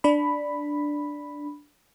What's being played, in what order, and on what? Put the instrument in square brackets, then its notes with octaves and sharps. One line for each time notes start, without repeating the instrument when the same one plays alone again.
[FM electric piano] D4 B5